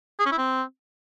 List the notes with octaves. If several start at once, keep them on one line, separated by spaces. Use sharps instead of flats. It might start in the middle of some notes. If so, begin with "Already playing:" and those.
G#4
C#4
E4
C4